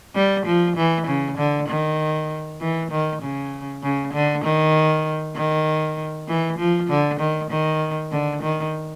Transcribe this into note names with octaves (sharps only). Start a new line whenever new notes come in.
G3
F3
E3
C#3
D3
D#3
E3
D#3
C#3
C#3
D3
D#3
D#3
E3
F3
D3
D#3
D#3
D3
D#3